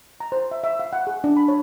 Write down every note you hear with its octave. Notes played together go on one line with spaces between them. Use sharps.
A#5
C5
E5
E5
F5
F#5
G#4
D4
B5
C#5